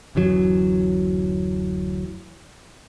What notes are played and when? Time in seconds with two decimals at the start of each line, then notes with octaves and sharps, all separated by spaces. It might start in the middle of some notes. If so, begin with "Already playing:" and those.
0.15 D1 F#2 E3 F#3